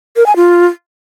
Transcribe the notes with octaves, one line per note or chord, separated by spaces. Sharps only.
A#4
G#5
F4